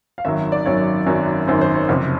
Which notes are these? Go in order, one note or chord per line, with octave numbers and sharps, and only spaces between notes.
F5
G#1 F#2 D#3 F#3 E5
D5
G#1 F#2 D#3 F#3 C#5
G#1 F#2 D#3 F#3
G#1 F#2 D#3 F#3 C5
C5
C#5
F#1 F2 C3